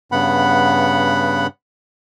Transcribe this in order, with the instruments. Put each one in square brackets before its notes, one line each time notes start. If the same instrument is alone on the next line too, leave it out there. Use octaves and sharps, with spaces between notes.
[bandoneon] G2 C#3 B3 F#5 B5